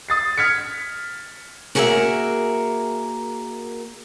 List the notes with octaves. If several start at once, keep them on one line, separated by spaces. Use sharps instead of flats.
D#6 A6 C7
F6 G#6 B6 C#7
A#3 F#4 G#4 A#4 D#5 E5